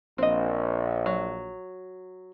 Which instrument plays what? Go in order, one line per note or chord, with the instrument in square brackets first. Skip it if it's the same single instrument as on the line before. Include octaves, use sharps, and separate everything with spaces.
[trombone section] A#1 [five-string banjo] C4 D#5
[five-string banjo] F#3